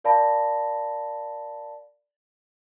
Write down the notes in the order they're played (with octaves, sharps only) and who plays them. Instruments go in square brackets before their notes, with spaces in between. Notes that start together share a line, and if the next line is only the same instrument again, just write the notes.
[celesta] A#4 D5 F5 A5 B5 A#6